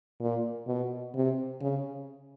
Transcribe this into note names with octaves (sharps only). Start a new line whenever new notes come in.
A#2
B2
C3
C#3